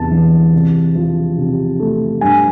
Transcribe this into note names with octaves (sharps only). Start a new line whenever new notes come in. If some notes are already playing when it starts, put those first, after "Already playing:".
Already playing: E2 C3 A5
E3
C3
F3
C3
A3
G2 G#5